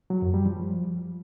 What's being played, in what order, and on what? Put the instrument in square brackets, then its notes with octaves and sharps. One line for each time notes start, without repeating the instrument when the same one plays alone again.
[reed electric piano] F#3
F#2
G3
F3